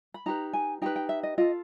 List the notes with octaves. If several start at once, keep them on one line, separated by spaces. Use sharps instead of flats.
B5
D#4 G4 B4 A#5
G#5
D#4 G4 B4 G5
G5
E5
D#5
F4 A4 D#5